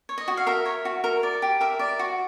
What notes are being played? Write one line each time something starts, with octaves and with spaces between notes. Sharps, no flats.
C#5
D#5
F#4
F5
A#4 E5
C#5
F#4
A#4
D5
G4
A#4 E5
D5
F#4